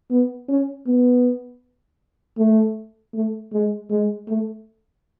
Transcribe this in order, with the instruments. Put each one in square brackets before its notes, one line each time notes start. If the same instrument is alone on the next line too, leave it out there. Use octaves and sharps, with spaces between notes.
[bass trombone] B3
C#4
B3
A3
A3
G#3
G#3
A3